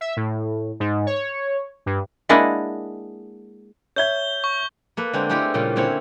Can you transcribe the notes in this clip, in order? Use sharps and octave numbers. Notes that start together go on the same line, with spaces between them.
E5
A2
G#2
C#5
G2
G#3 A#3 D4 E4 D#5 F#5
C#5 E5 G6 G#6 G7
C#6
A#3 A4 B4
D3 G#3 C4 D4 A#4 C5
G#3 A3 E4 G4 A4 A#4
A#2 C#3 G3 C#4 F4
D3 A#3 C4 C#4 E4 C#5